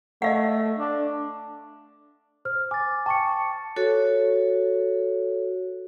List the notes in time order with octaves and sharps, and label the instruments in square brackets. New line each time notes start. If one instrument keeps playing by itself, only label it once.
[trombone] A3 [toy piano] D#5 F5 F#5
[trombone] D4
[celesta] C5 F6
[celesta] G#5 [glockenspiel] D6 A6
[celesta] G5 C#6 C#7 [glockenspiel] A5
[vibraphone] F#4 A4 C#5